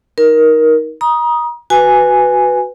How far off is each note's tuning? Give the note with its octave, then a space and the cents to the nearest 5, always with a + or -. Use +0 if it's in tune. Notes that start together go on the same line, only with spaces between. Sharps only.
D#4 +15 A#4 +15
A#5 +35 D#6 +0
F#4 +0 B4 +5 G#5 +0